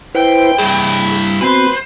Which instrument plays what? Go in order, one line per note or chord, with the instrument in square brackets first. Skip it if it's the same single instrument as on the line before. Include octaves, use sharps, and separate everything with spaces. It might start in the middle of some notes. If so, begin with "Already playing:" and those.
[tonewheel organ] E4 B4 C5 [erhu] G5
[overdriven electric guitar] G2 E4 [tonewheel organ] G#4
[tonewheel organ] B3 C4 F#4 [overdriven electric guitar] B4 [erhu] C5